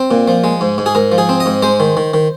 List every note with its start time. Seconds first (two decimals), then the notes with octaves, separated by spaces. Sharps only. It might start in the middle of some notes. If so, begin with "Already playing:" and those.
Already playing: C4
0.11 A#2
0.28 F3
0.44 G#3
0.61 G#2
0.78 G#2
0.86 G#4
0.95 G#2 A#4
1.12 F3
1.18 G#4
1.29 C4
1.40 D#5
1.46 G#2
1.62 G#3 C5
1.80 D#3
1.97 D#3
2.14 D#3